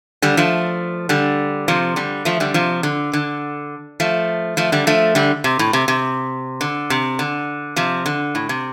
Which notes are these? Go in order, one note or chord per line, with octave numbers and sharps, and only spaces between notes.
D3 G3
F3 A3
D3 G3
C3 F3
D3 G3
F3 A3
D3 G3
C3 F3
D3
D3
F3 A3
F3 A3
D3 G3
F3 A3
D3 G3
C3
A2
C3
C3
D3
C3
D3
C3 F3
D3
A2
C3